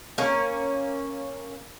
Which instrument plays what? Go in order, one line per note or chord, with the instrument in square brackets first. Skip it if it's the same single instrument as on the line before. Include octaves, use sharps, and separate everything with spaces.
[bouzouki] A#3 C#4